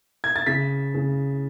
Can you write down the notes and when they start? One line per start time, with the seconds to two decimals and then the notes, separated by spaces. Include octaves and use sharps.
0.24 G#6
0.36 A6
0.47 C#3 B6
0.94 C#3